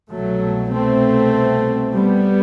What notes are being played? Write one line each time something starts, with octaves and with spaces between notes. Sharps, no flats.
C2 B2 F#3 A3
A3 C4
G3 B3